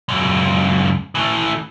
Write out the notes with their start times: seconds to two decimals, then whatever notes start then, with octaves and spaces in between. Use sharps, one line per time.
0.09 C#2 F#2
1.15 E3 A3